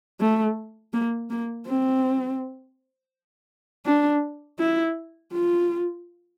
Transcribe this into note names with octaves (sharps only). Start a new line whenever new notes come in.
A3
A#3
A#3
C4
D4
E4
F4